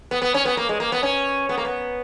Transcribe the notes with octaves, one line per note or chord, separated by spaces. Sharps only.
B3
B3
C#4
B3
A#3
G#3
A#3
B3
C#4
B3
A#3
B3